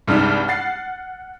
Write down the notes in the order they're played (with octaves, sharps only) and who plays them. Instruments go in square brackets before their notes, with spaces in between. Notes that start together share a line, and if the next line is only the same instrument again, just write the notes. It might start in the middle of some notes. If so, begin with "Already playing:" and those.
[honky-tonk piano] C2 G2 G3 G#3 D#4 F6
F#5 A6 C7